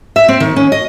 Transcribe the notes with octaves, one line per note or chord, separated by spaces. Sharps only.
E5
C4
D#3
C#4
D#5